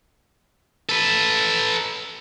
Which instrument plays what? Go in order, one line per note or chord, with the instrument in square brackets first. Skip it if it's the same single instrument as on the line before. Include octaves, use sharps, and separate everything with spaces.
[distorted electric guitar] A4 B4